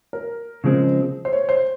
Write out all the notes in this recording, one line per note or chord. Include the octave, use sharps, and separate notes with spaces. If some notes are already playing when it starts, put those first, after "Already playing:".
A#4
C#3 F3 G#3 C4
C5
C#5
C5